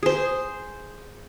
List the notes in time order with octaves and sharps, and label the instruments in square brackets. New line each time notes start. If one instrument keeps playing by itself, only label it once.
[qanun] G#4 C5